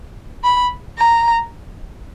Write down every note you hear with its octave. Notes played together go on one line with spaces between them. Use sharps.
B5
A#5